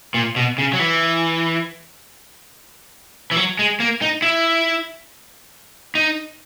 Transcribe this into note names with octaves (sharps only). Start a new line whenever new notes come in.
A#2
B2
C#3
F#3
E3
E3
F#3
G#3
A#3
D#4
E4
D#4